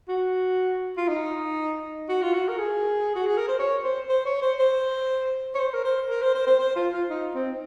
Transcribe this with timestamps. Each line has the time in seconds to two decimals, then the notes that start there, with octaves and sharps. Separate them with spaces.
0.08 F#4
0.97 F4
1.08 D#4
2.08 F#4
2.22 F4
2.34 F#4
2.48 A#4
2.59 G#4
3.15 F#4
3.26 G#4
3.37 A#4
3.48 C5
3.59 C#5
3.84 C5
4.09 C5
4.26 C#5
4.42 C5
4.59 C5
5.55 C#5
5.59 C5
5.74 A#4
5.84 C5
6.10 A#4
6.22 C5
6.34 C5
6.47 C5
6.59 C5
6.76 F4
6.93 F4
7.10 D#4
7.35 C4